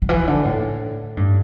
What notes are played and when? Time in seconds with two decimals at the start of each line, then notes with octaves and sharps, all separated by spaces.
0.02 D3
0.09 E3
0.27 D3
0.45 A2
1.17 G2